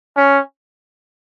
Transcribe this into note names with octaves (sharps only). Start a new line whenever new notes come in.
C#4